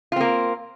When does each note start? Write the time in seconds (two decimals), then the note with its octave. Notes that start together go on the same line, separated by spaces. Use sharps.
0.12 F4
0.16 C4
0.20 A#3